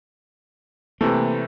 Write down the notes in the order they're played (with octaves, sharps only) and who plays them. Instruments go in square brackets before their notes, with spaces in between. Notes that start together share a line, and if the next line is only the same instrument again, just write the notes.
[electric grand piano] C3 E3 A3 [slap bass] A#3